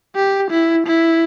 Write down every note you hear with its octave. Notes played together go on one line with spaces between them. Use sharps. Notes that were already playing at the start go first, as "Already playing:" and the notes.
G4
E4
E4